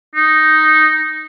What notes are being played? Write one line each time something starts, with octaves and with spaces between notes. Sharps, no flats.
D#4